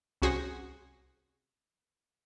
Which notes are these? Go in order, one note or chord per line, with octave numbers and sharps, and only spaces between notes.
C2 C#4 F#4 G#4 C5 A#6